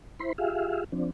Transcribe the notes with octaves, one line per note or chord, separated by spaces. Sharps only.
E4 C5 B5 C6
F4 G4 G#4 E5 F5
F3 C4 D4